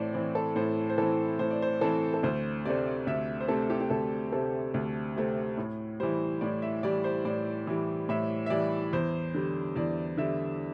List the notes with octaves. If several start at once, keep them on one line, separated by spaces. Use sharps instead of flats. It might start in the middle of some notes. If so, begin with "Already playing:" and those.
Already playing: A2 E3 C4 A4 C5 D5
E3 C4 D5
A4
A2 C5
C5
E3 C4 A4
A2 C5
D5
C5
E3 C4 A4
A4
D2 C5
C3 A3 C4 D5
D2 E5
C5
C3 A3 C4 A4
G4
G4
D2 A4
C3 A3 C4 A4
D2
C3 A3 C4
A2
E3 G3 C5
A2 D5
E5
E3 G3 D5
C5
A2 D5
E3 G3
A2 E5
E5
E3 G3 D5
E2 C5
D3 G3
E2 D5
D3 G3 E5